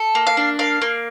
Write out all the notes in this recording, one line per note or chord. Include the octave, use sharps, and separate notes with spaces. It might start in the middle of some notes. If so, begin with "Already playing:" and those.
Already playing: A4
A#3
F5
D4
A#3 F5
A#3